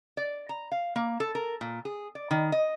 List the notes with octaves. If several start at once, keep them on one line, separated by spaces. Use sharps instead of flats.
D5
A#5
F5
A#3
A4
A#4
A#2
G#4
D5
D#3
D#5